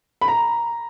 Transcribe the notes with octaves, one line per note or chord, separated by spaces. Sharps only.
B5
A#5